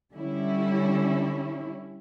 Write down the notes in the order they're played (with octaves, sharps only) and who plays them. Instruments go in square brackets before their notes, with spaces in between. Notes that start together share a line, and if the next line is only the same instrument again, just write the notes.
[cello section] D3 G3 C#4 E4